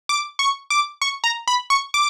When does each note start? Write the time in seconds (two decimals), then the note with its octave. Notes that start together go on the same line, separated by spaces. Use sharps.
0.09 D6
0.39 C#6
0.70 D6
1.01 C#6
1.24 A#5
1.48 B5
1.70 C#6
1.94 D6